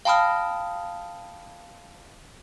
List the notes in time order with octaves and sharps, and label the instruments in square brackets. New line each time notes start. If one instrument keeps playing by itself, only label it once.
[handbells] F5 G5 A5 B5 D#6 F6